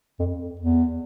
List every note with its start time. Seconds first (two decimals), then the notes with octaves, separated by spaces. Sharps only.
0.19 F2
0.60 E2